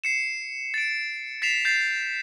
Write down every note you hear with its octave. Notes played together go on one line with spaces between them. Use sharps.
C7 C#7 E7
A6 D7
A6 B6 C7 E7 F7
G6 A6 C7